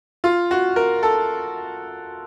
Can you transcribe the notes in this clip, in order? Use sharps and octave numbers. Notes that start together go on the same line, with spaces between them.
F4
F#4
A#4
A4